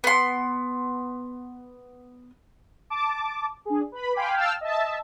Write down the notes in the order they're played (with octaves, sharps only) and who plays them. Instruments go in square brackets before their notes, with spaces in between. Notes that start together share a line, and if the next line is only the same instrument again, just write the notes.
[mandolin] B3 C6
[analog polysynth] A5 D6
D4 G#4
B4 B5
F5 G5 G#5 B5 C6 D6
F5 G5 A5 E6 F6
D#5 E5 A5